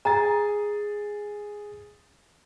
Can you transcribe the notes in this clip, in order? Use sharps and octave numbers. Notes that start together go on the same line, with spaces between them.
G#4 G#5 A#5 A6